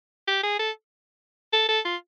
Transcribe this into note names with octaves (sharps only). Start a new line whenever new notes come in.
G4
G#4
A4
A4
A4
F4